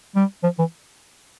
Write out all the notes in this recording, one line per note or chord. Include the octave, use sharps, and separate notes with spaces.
G3
F3
E3